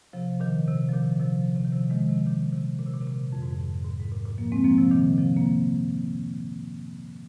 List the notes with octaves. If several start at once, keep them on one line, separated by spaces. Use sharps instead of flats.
C3 F3
A#2 D#3
C3
F3
A#2 D#3
C3 F3
C3
D#3
C3 F3
D#3 G#3
C3 F3
A#2 D#3
C3
A#2
C3
A#2
C3
A#2
F2
G#2
F2
G#2
G#2
A#2
A#2
F3 A#3
G#3 C4
F3 A#3
C3 F3
A#2 D#3
C3 F3
A#3